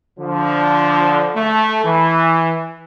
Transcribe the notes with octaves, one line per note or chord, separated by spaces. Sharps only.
D3 F3
A3
E3